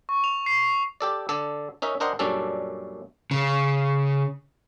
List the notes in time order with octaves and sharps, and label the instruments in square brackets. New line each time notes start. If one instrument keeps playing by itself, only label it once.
[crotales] C#6
F7
C7
[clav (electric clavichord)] G4 A4 D5
D3 A4 D5
C#4 D#4 A#4 E5
D4 A#4 C5 D#5 F#5 G5
F#2 A#2 G3 C#4 D4 A4
[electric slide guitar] C#3